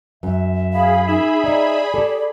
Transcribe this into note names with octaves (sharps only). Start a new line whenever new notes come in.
F#2 E5
G#4 F5 B5
D#4 E5
D#4 D5
G4 A4